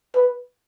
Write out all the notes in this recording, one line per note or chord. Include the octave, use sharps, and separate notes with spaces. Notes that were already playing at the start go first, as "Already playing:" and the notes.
B4